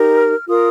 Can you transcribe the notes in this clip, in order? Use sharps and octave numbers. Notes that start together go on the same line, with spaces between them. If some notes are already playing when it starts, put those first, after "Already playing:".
Already playing: D#4 G4 A#4
F6
F4 A#4 D#6